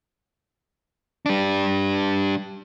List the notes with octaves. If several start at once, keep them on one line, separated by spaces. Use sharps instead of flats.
G3 D4